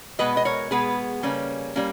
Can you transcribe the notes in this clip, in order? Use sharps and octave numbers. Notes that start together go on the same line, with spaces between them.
B2 G#3 B3 B4 D#5
D#5
A#4 C#5
B2 G#3 B3 G#4 B4
C#3 G3 A#3 C#4
G3 A#3 C#4